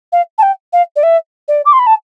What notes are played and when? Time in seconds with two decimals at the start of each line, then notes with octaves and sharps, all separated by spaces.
0.12 F5
0.38 A5
0.42 G5
0.73 F5
0.96 D5
1.03 E5
1.48 D5
1.65 D6
1.73 C6
1.79 B5
1.86 A5